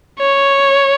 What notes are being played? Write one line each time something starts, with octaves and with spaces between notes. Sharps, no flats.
C#5